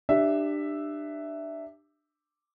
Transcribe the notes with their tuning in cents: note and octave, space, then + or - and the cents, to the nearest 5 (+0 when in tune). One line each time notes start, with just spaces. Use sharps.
D4 +25 G4 +0 E5 +0